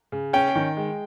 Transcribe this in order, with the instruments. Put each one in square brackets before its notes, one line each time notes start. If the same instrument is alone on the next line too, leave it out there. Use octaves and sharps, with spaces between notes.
[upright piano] C#3
[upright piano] C#4 [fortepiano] G5
[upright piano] D#3
G#3